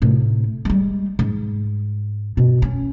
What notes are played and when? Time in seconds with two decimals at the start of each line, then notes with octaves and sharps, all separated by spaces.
0.02 A2 C3
0.65 G3 G#3
1.19 G#2
2.37 G2 B2
2.62 C#4